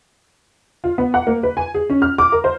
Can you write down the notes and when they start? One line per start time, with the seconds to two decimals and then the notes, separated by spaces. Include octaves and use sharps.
0.84 F4
0.98 B3
1.14 F#5
1.27 A#3
1.43 B4
1.57 G#5
1.74 G#4
1.90 C#4
2.02 F6
2.18 D6
2.32 A#4
2.44 C5